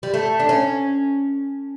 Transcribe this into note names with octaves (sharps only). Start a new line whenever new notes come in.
G3
A3
D4
C#4